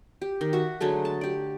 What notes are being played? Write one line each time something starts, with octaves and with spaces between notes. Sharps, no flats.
G4
D#3
F#4 E5
D3 F#3 G#3 A3
A5
G4 D5